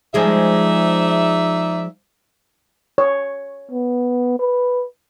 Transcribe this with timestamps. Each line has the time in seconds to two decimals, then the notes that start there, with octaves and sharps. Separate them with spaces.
0.14 F3 G#3 D#4 G#4 D5 E5
2.98 C#5
3.71 B3
4.39 B4